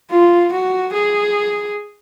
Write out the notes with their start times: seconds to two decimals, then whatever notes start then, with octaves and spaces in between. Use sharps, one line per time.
0.11 F4
0.53 F#4
0.94 G#4